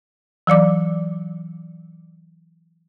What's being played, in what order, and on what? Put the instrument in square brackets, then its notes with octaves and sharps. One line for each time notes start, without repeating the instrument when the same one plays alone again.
[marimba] E3 F#3 D5 D6